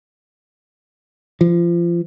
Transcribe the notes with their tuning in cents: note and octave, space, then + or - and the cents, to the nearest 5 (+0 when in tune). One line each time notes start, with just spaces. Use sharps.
F3 -30